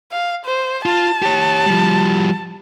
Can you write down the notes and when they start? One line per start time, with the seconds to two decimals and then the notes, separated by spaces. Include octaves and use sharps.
0.12 F5
0.45 C5
0.86 F4 A5
1.22 G4 C#5
1.66 F3 G3